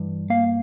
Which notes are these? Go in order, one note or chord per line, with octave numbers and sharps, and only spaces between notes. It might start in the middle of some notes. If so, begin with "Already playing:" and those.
Already playing: G2 E3
A#3 F5